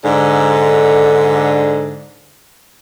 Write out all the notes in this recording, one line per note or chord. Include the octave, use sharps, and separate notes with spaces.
G#2 D3